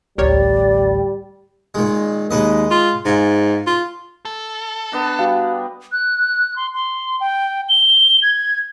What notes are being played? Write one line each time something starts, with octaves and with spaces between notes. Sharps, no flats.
A1 D2 G3 G4 A#4 C#5 D5
A#2 D#3 G#3
D#2 G#3 B4 D#5
F4
G#2 F4 G#5
F4
A4
B3 D4 A#5
G3 F#4 F5
F#6
C6
C6
G5
G7
G#6